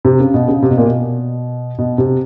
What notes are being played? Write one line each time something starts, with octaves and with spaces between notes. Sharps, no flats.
C3
C#3
B2
C#3
C3
B2
A#2
B2
B2
C3